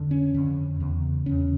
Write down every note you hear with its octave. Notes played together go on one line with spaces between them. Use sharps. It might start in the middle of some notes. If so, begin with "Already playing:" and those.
Already playing: F2 D3
C#4
F2 D3
E2 C#3
E2 C#3 C#4